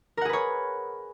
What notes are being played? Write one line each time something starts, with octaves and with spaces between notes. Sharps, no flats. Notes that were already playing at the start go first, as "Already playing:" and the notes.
G#4 A#4 B4 C#5 F#5